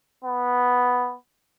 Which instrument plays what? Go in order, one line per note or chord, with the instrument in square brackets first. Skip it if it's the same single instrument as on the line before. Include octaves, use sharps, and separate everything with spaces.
[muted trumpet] B3